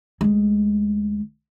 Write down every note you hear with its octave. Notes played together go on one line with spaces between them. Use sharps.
D2 G#3